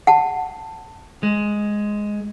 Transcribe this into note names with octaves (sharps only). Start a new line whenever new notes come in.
F#5 A5
G#3